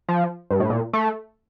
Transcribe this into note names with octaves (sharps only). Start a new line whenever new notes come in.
F3
G2
A2
A#2
A3